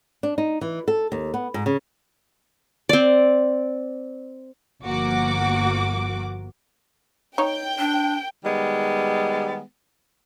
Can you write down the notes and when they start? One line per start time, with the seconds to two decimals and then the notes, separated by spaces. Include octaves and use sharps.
0.23 D4
0.38 D#4
0.61 E3
0.88 A4
1.12 D#2
1.34 B3
1.54 G#2
1.66 C#3
2.89 C4 D5
4.84 G1 F3 A#3 F#4 D6
7.38 D#4 C#5 G5
7.78 D4
8.44 D#3 G3 G#3 B3